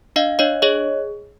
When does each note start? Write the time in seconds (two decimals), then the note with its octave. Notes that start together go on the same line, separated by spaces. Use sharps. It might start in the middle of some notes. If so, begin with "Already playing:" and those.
0.16 D4 D#5 F5
0.39 D4 C#5 D#5
0.62 G#4 C#5 D#5